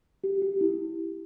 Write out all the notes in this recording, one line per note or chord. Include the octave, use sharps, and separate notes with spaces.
G4
G4
E4